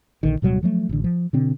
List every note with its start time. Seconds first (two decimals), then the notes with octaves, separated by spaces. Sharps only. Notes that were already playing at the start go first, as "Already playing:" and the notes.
0.23 A#1 D3 D#3
0.42 D1 B2 F#3 G3
0.63 F3 F#3 A3
0.89 A1 D3
1.04 F3
1.33 B2 D3 C4